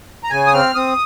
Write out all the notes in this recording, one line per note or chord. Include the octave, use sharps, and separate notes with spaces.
A#5
C#3 G#5
D#6
C4 F6
C4 D#6